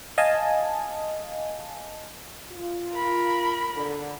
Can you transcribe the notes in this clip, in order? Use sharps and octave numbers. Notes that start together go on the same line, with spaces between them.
D#5 F5 G#5 A5
F4
A#4 B5
D3